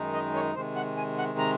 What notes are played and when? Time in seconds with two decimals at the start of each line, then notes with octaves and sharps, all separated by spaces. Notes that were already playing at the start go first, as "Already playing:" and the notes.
Already playing: F#2 D#3 G#3 D#4
0.14 D#5
0.35 C#5
0.55 C3 D#3 G#3 C5
0.76 F#5
0.97 G#5
1.18 F#5
1.39 A#5